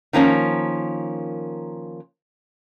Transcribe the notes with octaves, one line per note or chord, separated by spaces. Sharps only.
D#3 F3 A#3 C#4